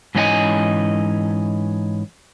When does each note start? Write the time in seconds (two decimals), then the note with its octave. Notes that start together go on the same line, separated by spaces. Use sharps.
0.15 G#2 E3 C#4 F4 D#5 G#5